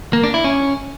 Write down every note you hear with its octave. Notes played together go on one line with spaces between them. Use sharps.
A#3
D4
E4
C#4